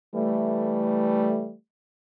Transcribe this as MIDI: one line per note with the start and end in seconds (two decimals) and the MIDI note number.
0.16 1.55 52
0.16 1.55 55
0.16 1.55 57